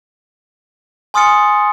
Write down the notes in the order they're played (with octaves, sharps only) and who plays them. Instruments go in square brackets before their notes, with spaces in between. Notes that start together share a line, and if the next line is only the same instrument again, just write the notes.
[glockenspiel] G#5 C6 D#6 F6 A6 C#7